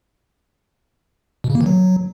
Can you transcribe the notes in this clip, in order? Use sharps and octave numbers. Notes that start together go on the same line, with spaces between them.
B2
C#3
A#3
D#3
F#3